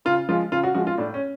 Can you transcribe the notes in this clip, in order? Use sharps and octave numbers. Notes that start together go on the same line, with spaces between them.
C#3 F4
F3 G#3 F4
C#3 F4
F#4
F3 G#3 F#4
F4
A2 D4
C#4